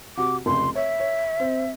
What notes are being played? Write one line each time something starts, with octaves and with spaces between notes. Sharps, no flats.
C3 F#4 D6
F1 C#2 C6
C#5 E5
C#5
C4